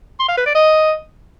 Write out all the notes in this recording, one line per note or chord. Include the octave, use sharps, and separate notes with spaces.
C6
F5
B4
D5
D#5